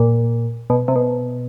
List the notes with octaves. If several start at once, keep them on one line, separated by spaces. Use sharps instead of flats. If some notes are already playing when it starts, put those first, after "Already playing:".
Already playing: A#2
B2
C3
B2